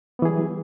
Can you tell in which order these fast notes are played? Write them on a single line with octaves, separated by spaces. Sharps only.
B3 E3 G#4 G3 F#3